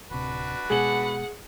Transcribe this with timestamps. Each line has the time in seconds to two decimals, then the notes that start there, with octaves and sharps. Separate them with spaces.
0.11 D1 C3 D4 F#4 B4
0.70 B2 G#3 G#4 F#5 F#7